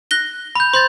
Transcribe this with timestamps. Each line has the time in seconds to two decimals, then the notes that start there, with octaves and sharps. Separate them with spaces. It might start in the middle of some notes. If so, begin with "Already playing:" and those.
0.11 F#6 A#6 G7
0.55 B5 G6
0.73 C5 C6 G6 A6